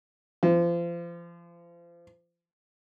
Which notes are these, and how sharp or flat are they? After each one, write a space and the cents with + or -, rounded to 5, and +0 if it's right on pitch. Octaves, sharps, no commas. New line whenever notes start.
F3 -35